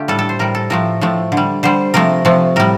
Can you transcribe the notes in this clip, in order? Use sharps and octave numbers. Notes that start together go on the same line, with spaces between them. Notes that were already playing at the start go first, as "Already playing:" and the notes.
Already playing: D3 A3 F4 G4
A2 G3 A4
A4
C5
A2 G3 A#4
A4
A2 F3 A3 A#4
A2 F3 A3
D3
G3
D3 G3 C5
C3 F3 A3 A#4
C3 F3 A3
A2 G3 A#4